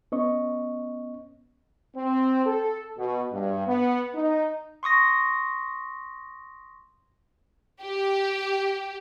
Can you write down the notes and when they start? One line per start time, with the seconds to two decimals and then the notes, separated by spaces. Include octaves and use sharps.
0.12 B3 C#4 D#5 C#6
1.96 C4
2.46 A4
2.98 B2
3.33 G2
3.67 B3
4.15 D#4
4.83 C6 C#6 D#6 A#6
7.83 G4